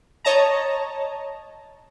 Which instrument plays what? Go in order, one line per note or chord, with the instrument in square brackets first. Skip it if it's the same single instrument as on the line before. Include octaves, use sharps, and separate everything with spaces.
[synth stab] C#5 D#5 A5 A#5